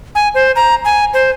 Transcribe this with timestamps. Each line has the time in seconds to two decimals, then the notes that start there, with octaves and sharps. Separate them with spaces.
0.15 G#5
0.34 C5
0.56 A#5
0.85 G#5
1.14 C5